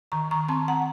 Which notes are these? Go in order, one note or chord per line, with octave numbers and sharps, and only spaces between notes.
D#3 A#5 C#6
A#5 C#6
C4 A5 C6
F#5 A#5